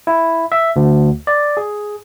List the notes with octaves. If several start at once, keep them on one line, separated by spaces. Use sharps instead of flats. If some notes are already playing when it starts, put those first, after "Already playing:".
E4
E5
D2
D5
G#4